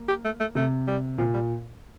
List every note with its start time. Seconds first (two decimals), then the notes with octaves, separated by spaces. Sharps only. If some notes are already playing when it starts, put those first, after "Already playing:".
Already playing: A#3
0.08 G4
0.25 A3
0.40 A3
0.55 C3 A3
0.87 G3
1.18 A#2 F3
1.34 G3